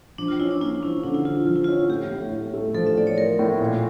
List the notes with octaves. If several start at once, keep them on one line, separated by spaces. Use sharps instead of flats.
F3 D4
F4
C#4 E4
D4
A#3 E4
F3 C#4
D3 D4
E4
F3 F4
F4
F3 F4
E4
F4
C#4
A2 G4
A2
A2
A3
F3 A4
E5
A2 D5
C#5
A3 A#4
A2
A#2